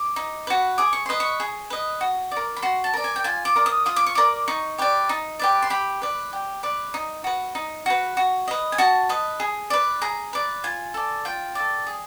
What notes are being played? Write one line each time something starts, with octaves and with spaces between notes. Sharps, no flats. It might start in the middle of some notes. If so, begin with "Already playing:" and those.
Already playing: D6
D#4
F#4 B4
G#4 D6
C#6
B4 D#5 C6
C#6
G#4
B4 D#5
F#4
D5
A#4
B5
F#4 C6
A5
A#4 D5
G#5
G5
F4 G#5
D6
A#4 D5
D#6
F4 D#6
D6
C#6
A#4 D5 D6
D#4 C#6
G4 B4 D5
D#4
G4 B4 D5
C6
G4 B5
B4 D5
G4
B4 D5
D#4
F#4 B4
D#4
F#4 B4
F#4
B4 D#5
G#5
F#4 A5
B4 D#5
G#4
B4 D5
G#4 A#5
B4 D5
F4 G#5
A4 D5
F4 G5
A4 D5
G#4